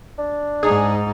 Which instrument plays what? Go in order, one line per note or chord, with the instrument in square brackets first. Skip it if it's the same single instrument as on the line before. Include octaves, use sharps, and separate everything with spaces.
[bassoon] D4
[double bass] G#2 D#4 [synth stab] G#4